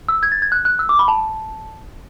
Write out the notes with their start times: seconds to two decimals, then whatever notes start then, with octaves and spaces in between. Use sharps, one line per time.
0.09 E6
0.23 G#6
0.32 A6
0.42 G#6
0.52 F#6
0.65 F#6
0.79 E6
0.89 D6
0.99 B5
1.08 A5